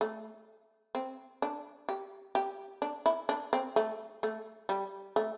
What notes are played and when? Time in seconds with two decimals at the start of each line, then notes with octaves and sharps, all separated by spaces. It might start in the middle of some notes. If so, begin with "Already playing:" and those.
0.01 A3
0.95 C4
1.42 D4
1.89 G4
2.35 G4
2.82 D4
3.06 E4
3.29 D4
3.53 C4
3.76 A3
4.23 A3
4.69 G3
5.16 A3